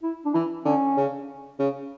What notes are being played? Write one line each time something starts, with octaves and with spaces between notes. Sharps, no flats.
E4
D4
E3 E4
D3 C#4
C#3
C#3